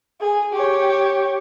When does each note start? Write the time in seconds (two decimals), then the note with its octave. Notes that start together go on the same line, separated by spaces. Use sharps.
0.20 G#4
0.53 G4 C#5